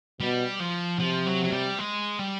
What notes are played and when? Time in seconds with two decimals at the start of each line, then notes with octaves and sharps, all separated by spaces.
0.20 B2 G3
0.60 F3
1.00 C3 F3
1.26 F#3
1.44 F#3
1.52 G3
1.79 G#3
2.19 G3